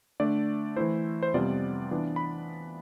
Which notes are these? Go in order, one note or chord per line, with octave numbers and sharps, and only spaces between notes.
D3 A3 D4 D5
E3 A3 E4 C5
C5
F2 C3 G3 B3 F4 D5
E3 B3 D4 F4
B5